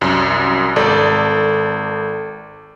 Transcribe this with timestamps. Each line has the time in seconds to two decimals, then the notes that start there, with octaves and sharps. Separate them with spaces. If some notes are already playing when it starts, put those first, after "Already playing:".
0.01 C2 F#2
0.76 G#1 A4 D5